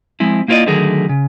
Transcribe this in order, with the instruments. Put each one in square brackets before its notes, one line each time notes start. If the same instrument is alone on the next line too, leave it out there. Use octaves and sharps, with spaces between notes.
[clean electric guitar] F3 G#3 C4 E4
A#3 E4 F4 B4 D5 D#5
D3 D#3 F#3 A3 G#4 A#4
C#3